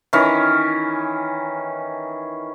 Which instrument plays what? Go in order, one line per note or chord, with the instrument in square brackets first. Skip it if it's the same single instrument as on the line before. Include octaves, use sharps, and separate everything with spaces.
[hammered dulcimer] D#3 E3 C#4